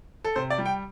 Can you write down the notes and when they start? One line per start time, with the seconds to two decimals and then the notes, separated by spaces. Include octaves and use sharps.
0.25 A4
0.36 C3 C5
0.50 D5
0.58 G3
0.66 G5